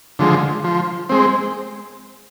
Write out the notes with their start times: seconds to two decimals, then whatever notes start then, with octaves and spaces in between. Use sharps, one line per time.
0.19 D3 F3 G#3
0.64 F3
1.09 G#3 C4